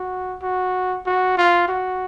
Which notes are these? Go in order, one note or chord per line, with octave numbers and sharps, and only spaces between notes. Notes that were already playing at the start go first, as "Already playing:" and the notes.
Already playing: F#4
F#4
F#4
F4
F#4